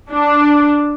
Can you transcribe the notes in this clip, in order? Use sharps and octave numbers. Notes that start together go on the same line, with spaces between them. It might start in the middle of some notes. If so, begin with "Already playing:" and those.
D4